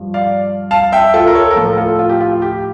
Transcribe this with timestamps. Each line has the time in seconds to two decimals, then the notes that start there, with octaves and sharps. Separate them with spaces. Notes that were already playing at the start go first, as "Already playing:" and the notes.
Already playing: G2 F3
0.14 D5 F5
0.71 F5 A5
0.92 E5 G5
1.14 F4 A4
1.27 A#4
1.35 A4 C#5
1.51 A#4
1.56 A2 F3 F4 A4
1.72 A#4
1.77 F4 A4
1.99 F4
2.09 G4
2.21 F4
2.42 G4